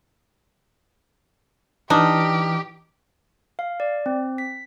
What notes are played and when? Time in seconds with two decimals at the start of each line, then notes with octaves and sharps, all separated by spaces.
1.90 E3 D4 D#4 G4 F6
3.59 F5
3.80 D5
4.06 C4
4.38 B6